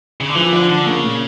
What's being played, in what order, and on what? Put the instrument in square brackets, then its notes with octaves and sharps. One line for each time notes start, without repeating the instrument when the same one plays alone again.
[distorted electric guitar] C#3
D3
[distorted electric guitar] E3 [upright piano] F3
[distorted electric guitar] D3 [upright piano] F3
[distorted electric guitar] D3 [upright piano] F3
[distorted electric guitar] C#3 [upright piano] A#3
[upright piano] A#2